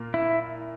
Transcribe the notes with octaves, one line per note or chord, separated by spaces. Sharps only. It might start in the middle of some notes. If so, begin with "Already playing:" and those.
Already playing: A#2 A#3 F4
E4